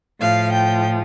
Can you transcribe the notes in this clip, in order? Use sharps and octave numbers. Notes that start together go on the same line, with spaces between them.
A2 F3 F5
G5